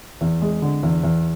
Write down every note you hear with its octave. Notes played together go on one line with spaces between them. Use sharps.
E2
G#3
D3
E2
E2